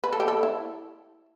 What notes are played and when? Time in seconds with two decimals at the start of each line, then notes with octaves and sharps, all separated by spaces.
0.04 B4
0.13 A4
0.20 G4
0.28 A4
0.43 E4